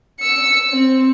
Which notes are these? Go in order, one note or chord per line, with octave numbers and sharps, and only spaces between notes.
E6 C#7
C4